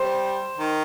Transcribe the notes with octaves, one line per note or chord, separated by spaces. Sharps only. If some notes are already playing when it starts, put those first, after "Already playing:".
Already playing: G3 C5
D#3